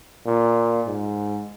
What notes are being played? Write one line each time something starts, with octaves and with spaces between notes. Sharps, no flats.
A#2
G#2